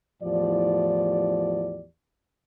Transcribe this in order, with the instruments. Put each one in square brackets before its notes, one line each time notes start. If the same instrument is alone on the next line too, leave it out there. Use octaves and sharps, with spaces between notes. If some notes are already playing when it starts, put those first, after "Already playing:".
[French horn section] E2 A2 F3 G4 D5